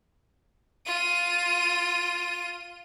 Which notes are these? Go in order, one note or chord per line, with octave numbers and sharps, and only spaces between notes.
F4 D#7